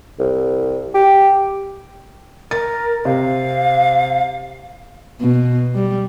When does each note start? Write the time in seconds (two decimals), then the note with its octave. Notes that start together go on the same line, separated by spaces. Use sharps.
0.19 C2
0.94 G4
2.51 A#4 A6
3.05 C3 F5
5.21 B2
5.75 G3